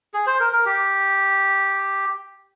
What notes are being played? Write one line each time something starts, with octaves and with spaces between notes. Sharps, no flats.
G#4
C5
A#4
A#4
G4